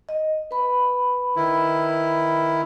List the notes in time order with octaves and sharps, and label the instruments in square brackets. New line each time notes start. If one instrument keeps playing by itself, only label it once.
[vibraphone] D#5
B4 B5
[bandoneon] D#3 E4